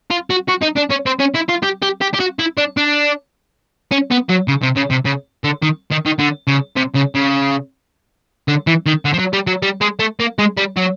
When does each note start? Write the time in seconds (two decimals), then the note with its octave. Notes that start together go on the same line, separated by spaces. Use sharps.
0.11 F4
0.30 F#4
0.49 F#4
0.63 D#4
0.77 D4
0.91 C#4
1.06 C4
1.19 C#4
1.34 E4
1.49 F4
1.63 G4
1.82 G4
2.01 G4
2.14 G4
2.20 F#4
2.39 E4
2.57 D4
2.77 D4
3.91 C#4
4.11 B3
4.29 F#3
4.48 C#3
4.63 C3
4.77 C#3
4.91 C3
5.05 C#3
5.44 D3
5.62 D#3
5.91 D#3
6.06 D#3
6.19 D3
6.47 C#3
6.76 C3
6.95 C#3
7.15 C#3
8.48 D3
8.67 E3
8.86 D#3
9.05 D3
9.14 F3
9.19 F#3
9.33 G3
9.47 F#3
9.63 G3
9.81 G#3
10.00 A3
10.20 A#3
10.39 G#3
10.57 G3
10.76 F#3